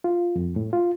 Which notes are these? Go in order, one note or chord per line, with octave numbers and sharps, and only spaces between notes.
F4
F2
A2
F4